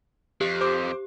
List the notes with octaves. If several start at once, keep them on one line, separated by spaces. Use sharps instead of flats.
F2 G4
C5 D6